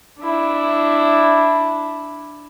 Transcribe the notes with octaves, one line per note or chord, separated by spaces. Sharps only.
D4 E4